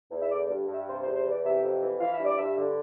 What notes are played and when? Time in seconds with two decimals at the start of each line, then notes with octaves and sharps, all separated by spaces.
0.11 E2
0.22 E5
0.30 D3 D5
0.44 D5
0.50 G2
0.68 G2
0.73 E5
0.87 C3 C5
1.01 C5
1.06 E2
1.15 C5
1.25 E3 D5
1.44 C3 E5
1.63 F2
1.82 E3
2.01 E3 F5
2.13 E5
2.19 G2 D5
2.37 G2 E5
2.57 D3